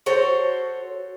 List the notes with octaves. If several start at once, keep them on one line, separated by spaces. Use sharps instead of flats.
F#4 A4 C5 C#5